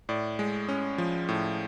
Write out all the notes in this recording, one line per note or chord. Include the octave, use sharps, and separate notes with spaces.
A2 D5
G#3
C#4
F3
A2